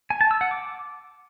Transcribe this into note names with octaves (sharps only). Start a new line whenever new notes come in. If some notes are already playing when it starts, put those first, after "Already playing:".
G#5
A5
E6
F#5
D6